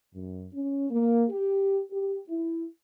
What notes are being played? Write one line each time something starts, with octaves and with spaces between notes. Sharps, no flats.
F#2
C#4
A#3
G4
G4
E4